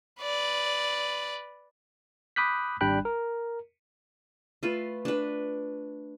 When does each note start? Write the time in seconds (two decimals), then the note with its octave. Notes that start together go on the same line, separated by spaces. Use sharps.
0.21 B4 D5
2.36 B5 D6 D#6 F#6 G6 B6
2.81 G#1 G3 D4 G5 B5 F#6
3.05 A#4
4.63 A3 F4 B4
5.05 D4 B4